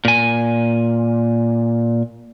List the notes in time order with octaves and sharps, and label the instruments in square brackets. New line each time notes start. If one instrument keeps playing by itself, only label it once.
[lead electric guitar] A#2 G#5